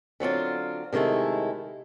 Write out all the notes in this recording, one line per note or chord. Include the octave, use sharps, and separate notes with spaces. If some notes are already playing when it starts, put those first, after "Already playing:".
D3 F#3 C4 F4
C3 D#3 G#3 A3 E4